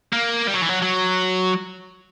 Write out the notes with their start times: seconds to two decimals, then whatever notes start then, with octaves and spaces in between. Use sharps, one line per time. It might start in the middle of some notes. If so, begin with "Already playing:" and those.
0.13 A#3
0.47 G3
0.55 F#3
0.62 E3
0.69 F#3
0.82 F#3